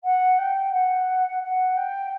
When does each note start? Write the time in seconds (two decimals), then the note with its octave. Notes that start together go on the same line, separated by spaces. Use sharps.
0.04 F#5
0.38 G5
0.72 F#5
1.42 F#5
1.77 G5